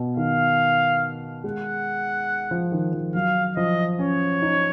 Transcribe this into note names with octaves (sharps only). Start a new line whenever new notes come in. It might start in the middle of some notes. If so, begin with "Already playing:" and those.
Already playing: B2
D#3 F5
G#3 F#5
F3
D#3
F3
F#3 F5
F3 D#5
C#4 C#5
D#4